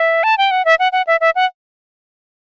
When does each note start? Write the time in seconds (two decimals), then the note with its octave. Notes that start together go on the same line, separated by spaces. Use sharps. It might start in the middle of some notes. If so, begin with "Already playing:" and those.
Already playing: E5
0.23 A5
0.38 G5
0.51 F#5
0.65 E5
0.79 F#5
0.92 F#5
1.07 E5
1.21 E5
1.35 F#5